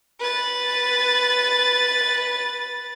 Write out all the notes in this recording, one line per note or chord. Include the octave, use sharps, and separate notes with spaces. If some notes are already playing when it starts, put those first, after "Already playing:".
B4 A6